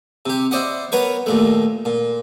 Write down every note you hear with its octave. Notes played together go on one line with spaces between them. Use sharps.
C3 G4
E4 C5 D5 D#5 F#5
B3 A#4 B4 C#5
D#2 A#2 A3
A#2